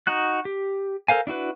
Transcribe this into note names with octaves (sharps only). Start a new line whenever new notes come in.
D#4 F#4 F#6
G4
A4 A#4 C5 F5 G#5
D4 E4 F#4 B4